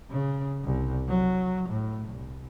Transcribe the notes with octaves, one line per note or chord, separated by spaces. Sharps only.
C#3
C2
F#3
A2
C2